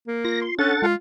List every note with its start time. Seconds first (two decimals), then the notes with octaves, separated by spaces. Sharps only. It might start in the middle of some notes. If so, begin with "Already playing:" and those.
0.08 A#3
0.25 F4 A#6
0.42 C6
0.59 C#4 D4 A4 F#5 A6
0.82 G#3 F4